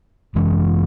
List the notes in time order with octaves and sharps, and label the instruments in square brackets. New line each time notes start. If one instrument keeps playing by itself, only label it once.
[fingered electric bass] F#2 E3 G#3